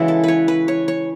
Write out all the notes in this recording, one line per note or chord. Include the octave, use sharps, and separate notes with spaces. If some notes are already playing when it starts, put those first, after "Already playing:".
Already playing: C#3 E3 G#3 E4 F#4
A4
B4 C#5
B4
C#5
C#5